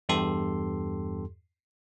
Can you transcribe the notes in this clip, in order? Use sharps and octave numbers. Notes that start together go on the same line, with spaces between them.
E2 G2 G4 A4 C6